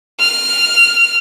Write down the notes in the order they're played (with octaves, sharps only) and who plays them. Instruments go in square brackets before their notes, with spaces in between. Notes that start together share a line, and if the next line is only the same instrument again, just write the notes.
[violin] F6